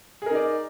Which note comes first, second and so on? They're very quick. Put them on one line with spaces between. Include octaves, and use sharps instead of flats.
G#4 A#4 D#4 D5